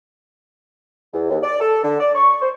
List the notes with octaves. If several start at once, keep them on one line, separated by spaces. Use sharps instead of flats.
E2
D#2
D5
A4
D3
D5
C#6
C5